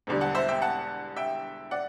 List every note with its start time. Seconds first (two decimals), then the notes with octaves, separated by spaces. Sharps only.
0.07 E1 E2 D3 G3
0.21 F#5 A5
0.35 C5 E5
0.48 E5 G5
0.62 F#5 A5
1.16 E5 G5
1.71 D5 F#5